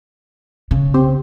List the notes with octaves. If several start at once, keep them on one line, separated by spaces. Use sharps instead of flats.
C#3
C4 G4 C5